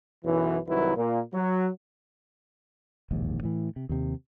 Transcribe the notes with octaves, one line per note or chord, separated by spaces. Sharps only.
B1 F#2 E3
C2 D#3 F#3 E4 B4
A#2 A#3
F#3
E1 A#1 D#2 G#2
A2 E3
C3
D#2 C3